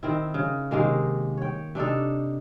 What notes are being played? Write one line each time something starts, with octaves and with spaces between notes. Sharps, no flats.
D#3 C4 E4
C#3
C3 D#3 G#3 A#3
C#5 G5
C3 D4 D#4 A4